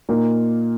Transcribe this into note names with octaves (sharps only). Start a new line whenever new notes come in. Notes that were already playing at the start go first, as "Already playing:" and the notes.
A#2 A#3 D#4